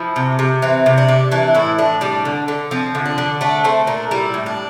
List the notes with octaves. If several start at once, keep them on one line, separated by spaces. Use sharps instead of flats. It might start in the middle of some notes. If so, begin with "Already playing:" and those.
Already playing: F3 E4
C3
C3
E3 C4
C3
D4
C3
E3 D4
A2 E4
A2 D4
G3 D4
D3
D3
F3 C4
D3
D4
D3
A3 D4
A3 C4
A#2 D4
G3 E4
A2
D4